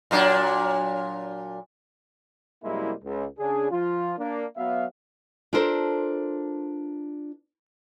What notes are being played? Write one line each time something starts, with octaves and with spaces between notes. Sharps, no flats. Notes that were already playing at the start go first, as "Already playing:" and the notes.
A#2 F#3 D4
F#2 C3 G3 G#3 A#3 E4
C#2
C#3 D4 G#4
F3 F4
A#3 D4
F#3 B3 E5 F5
D4 F4 A4 A#4 C5